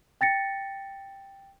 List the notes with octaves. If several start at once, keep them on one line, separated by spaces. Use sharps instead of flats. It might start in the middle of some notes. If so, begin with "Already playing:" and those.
G5 A6 A#6 C#7